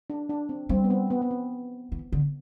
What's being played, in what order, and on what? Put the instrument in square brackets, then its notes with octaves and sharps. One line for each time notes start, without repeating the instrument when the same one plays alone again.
[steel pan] D4
D4
C4
[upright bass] G3 [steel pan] C4
[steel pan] B3
C4
B3
B3
C4
[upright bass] E3
D3